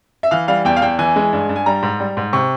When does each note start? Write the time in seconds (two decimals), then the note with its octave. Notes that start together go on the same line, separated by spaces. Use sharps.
0.23 E5
0.31 E3 F5
0.48 G3 F5
0.65 E2 G5
0.76 F5
0.82 E2 G5
0.99 E3 G#5
1.16 G#3
1.33 G2
1.49 G2
1.56 G#5
1.66 G3 A#5
1.82 G#2
2.00 G3
2.17 G#2
2.33 C3 C#6